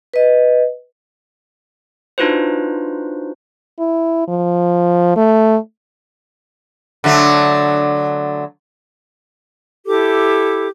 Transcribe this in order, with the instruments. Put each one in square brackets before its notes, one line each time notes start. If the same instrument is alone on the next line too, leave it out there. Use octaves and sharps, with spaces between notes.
[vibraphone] B4 D#5
[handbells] D4 D#4 F4 F#4 B4 C5
[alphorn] E4
F3
A3
[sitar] D3 F#3 A3
[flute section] E4 G4 A4 D6